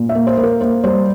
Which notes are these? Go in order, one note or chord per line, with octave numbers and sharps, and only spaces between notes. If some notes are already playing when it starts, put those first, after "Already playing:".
Already playing: A#2
E5
A#3
C5
A#3
A#4
A#3 C5
G3 C5